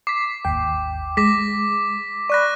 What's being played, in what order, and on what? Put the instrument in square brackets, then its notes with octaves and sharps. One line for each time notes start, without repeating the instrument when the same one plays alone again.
[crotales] D6 [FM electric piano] B6 C7
[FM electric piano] G#1 D#2 G5
[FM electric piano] G#3 [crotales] D6 A#6 B6
[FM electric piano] D5 B5 [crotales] C#6 F#6 A#6